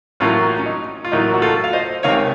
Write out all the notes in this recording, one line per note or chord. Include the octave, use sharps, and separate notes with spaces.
A1 A2 F#3 A#3 C#4 F4
C#4
D#4
F4
A1 A2 F#3 A#3 D#4
F#4
F4 A4
F5
C5 D#5
C#2 C3 D#3 C#5 F5